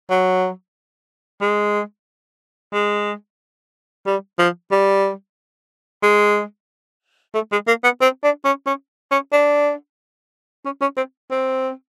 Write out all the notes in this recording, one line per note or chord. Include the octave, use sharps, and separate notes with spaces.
F#3
G#3
G#3
G3
F3
G3
G#3
A3
G#3
A#3
B3
C4
D4
C#4
C#4
C#4
D4
C#4
C#4
C4
C4